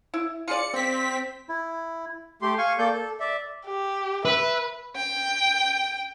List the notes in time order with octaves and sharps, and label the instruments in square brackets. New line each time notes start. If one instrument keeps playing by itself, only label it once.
[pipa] E4
[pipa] F4 G#4 D5 [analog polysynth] C#7
[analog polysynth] C4 B6
[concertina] E4
[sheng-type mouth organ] A3 G4 C6
F5 G#5 C#6
A#3 A4 D5 G6
A4
D5 E5
[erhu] G4
[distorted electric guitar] B4 [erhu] E5
[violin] G5